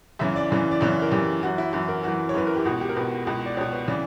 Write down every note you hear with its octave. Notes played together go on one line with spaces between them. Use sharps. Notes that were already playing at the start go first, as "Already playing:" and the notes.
F#2 C#3 E3 E5
D5
F#2 C#3 E3
D5
F#2 C#3 E3 C#5
A#4
F#2 C#3 E3 G4
F#2 E3 F#4
E4
F#2 E3 F#4
A#4
F#2 E3 F#4
C#5
F#2 E3 B4
A#4
G4
C#2 B2 F#4
G4
A#4
C#2 B2 B4
C#2 B2
D5
C#2 B2 C#5
B4
C#3 E3 D5